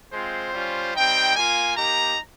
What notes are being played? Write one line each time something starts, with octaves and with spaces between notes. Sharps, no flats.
G#3 C4 F4 C5
G3 C#4 F4
G3 C4 D#4 G5
A#3 F4 G#5
A#3 D#4 G4 A#5